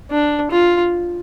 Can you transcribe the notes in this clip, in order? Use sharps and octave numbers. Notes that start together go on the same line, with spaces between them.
D4
F4